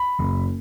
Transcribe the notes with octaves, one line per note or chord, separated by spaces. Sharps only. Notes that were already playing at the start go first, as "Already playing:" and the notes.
Already playing: B5
F#1